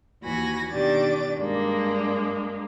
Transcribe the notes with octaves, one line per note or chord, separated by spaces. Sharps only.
D#2 E3 F#4 G#5 B5 A#6
B2 D#3 D4 G4 D6 A6
G2 G#3 A#3 D4